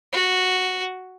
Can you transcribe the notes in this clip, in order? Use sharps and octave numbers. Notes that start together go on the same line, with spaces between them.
F#4